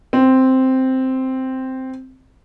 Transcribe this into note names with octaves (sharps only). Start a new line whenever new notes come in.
C4